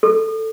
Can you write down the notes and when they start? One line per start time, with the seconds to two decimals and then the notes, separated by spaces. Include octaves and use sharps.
0.03 A4